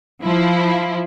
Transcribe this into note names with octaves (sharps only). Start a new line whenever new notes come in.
F3 E4